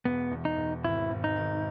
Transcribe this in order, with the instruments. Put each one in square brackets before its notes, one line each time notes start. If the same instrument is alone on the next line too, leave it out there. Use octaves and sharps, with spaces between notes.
[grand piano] E1 [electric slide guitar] B3
[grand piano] E2
[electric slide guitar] D#4
[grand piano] E1
[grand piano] G#1 [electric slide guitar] E4
[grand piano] G#1
[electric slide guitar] D#4
[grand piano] D#3